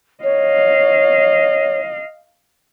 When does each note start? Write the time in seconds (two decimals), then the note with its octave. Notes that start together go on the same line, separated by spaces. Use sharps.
0.24 C#5 D#5 F5